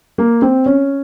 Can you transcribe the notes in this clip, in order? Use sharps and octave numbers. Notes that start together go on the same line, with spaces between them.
A#3
C4
C#4